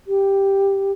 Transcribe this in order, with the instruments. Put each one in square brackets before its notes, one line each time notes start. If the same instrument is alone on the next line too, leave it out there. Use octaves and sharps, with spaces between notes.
[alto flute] G4